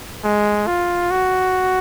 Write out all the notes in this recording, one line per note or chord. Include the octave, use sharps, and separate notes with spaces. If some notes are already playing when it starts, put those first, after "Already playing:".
G#3
F4
F#4